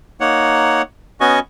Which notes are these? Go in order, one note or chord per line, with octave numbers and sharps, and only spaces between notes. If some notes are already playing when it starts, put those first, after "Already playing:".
A#3 D#4 C#5 F#5
B3 C#4 F#4 D#5 G#5 C#6